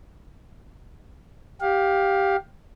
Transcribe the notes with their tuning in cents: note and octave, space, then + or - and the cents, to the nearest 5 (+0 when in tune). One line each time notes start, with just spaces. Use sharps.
G4 +0 F5 +20